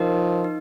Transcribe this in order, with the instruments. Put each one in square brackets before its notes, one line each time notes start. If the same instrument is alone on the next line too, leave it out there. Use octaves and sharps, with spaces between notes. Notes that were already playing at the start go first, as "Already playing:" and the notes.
Already playing: [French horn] F3 [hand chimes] D#4 A#4 D#5
[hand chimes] D#4